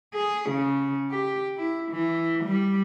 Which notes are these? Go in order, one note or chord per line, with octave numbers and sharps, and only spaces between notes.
G#4
C#3
G4
E4
E3
G3